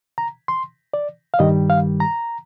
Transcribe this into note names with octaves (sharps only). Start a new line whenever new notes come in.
A#5
C6
D5
F5
G2 D#3 G3 D#5
F5
A#5